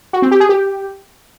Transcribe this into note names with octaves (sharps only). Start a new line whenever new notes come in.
F#4
C4
G4
G#4
G4